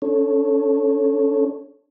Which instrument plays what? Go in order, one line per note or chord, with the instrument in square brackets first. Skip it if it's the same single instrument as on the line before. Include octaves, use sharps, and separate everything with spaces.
[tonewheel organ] C#4 D4 A4 C#5